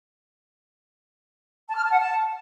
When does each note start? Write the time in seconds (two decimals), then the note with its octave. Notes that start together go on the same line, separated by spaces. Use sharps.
1.68 A5
1.76 F6
1.84 A5
1.92 F#5
2.00 A5